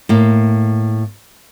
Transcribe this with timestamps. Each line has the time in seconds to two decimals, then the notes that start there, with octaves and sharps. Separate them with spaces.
0.09 A2 A#3